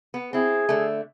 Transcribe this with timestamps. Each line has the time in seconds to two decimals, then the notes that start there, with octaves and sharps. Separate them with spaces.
0.14 B3
0.33 C4 E4 G#4
0.69 D3 A3